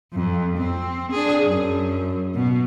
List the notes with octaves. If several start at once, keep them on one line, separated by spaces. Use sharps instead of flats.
F2
C4
D4 G#4
F#2
B2